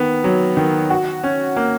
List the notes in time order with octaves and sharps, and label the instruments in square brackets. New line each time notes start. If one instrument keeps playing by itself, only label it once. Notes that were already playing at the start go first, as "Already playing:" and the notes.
Already playing: [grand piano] D#3 B3
F#3
D#3
F#4
C#4
A#3